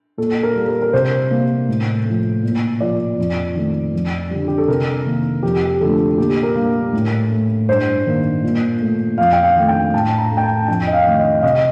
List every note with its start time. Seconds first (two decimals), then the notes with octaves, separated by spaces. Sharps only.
0.18 A#2 A4
0.43 A#4
0.56 G3 A#3
0.68 A#4
0.82 A#4
0.93 C3 C5
1.31 G3 A#3
1.68 A2
2.05 F3 A3
2.43 A#2
2.80 F3 A#3 D5
3.18 F2
3.56 D#3 A3
3.93 F2
4.31 D3 G3
4.48 G4
4.58 A4
4.68 C3 A#4
5.06 D#3 A#3
5.43 F2 G4
5.64 G4
5.81 D3 F3 A3 A4
6.18 A#2 G4
6.43 A#4
6.56 G3 A#3
6.93 A2
7.31 A3
7.68 G2 C5
8.06 D#3 A#3
8.43 A#2
8.81 A3
9.18 F2 F5
9.33 G5
9.43 F5
9.56 D#3 A3
9.68 G5
9.94 A2 A5
10.18 A#5
10.31 A3
10.37 G5
10.43 A5
10.68 F2 G5
10.87 D#5
10.93 F5
11.06 D#3 A3
11.19 D#5
11.39 F5
11.43 C3 D#5